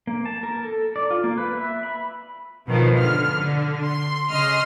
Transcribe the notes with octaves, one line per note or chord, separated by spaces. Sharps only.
A#3
A5
A#4
A4
D5
F4
A#3
B4
E5
B5
B2 D#3 F3
D3 F6
D3
C6
C#3 D#5 C6 F6